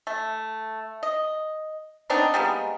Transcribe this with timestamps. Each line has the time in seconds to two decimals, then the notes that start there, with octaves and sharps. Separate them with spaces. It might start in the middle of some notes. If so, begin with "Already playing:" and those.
0.07 A3
1.03 D#5
2.10 B3 C4 D4 D#4
2.34 G3 G#3 A#3 B3